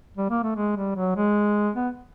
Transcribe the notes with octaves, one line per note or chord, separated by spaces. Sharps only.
G3
A#3
A3
G#3
G3
F#3
G#3
B3